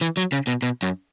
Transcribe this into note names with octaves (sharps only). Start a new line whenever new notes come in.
E3
F#3
C#3
B2
B2
F#2